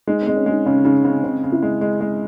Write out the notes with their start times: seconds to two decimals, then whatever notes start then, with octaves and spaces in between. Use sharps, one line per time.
0.07 G#3 D#4
0.22 G#3 C4
0.36 C#4
0.46 G#3 D#4
0.66 C#3 C#4
0.84 C#3 D#4
1.04 C#3 C4
1.23 C#3 C4
1.43 C#3
1.52 E4
1.62 G#3
1.81 G#3
2.01 G#3